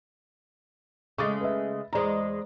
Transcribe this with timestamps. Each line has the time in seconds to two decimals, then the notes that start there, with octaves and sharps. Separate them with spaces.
1.18 C#3 G#3 A3 C#6 D6 A6
1.41 B4 E5
1.93 E2 G#3 C5 D5 A#5